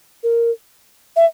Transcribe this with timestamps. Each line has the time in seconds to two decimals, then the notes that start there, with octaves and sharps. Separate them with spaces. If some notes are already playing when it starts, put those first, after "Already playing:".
0.23 A#4
1.16 E5